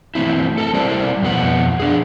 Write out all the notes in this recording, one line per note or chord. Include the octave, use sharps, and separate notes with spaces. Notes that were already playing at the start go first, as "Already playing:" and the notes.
E3 A3 C4 E4
A4 A#4 A5
G3 E4 A#4 C5 D5
F2 B2 B3 F#5
D4 G#4